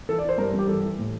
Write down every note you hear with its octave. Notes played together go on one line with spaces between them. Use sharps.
E3 A4
D5
E3
C5
G2 A#4
G2 G4
E3 A4
E3
A2